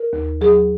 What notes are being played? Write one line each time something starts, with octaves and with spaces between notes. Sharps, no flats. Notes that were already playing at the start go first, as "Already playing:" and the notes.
Already playing: A#4
D#2
F#3 G#4